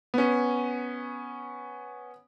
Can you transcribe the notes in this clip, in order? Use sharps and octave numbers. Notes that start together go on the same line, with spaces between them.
B3 C#4